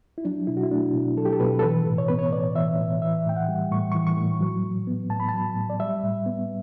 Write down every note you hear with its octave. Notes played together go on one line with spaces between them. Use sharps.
E4
F#3 D4
B2 E4
F#4
E4
A3 D4
B2
F#3 A4
G4
A4
B2 B4
A4
E3 B4
A2
C#5
B3 B4
C#5
A2 D5
E3 E5
A2
E3 E5
A2 G5
F#5
G3
A2 C#6
E3 C#6
C#6
A2
F#3
A2
B3
A2 A5
B5
A5
F#3
A2
D5
G3 E5
A2
B3